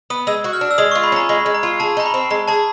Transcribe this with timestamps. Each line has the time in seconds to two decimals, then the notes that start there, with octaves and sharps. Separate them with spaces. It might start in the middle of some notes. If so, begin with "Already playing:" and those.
0.10 B3 D#6
0.27 G#3 E6
0.44 F#4
0.53 F6
0.61 D4
0.71 E6
0.78 G#3 D#6
0.92 F4 C#6
1.04 B5
1.12 C#4 A#5
1.29 G#3 B5
1.46 G#3
1.55 A#5
1.63 F4
1.80 G#4 A5
1.97 D#4 A#5
2.06 B5
2.14 C4
2.31 G#3 A#5
2.48 G#4 A5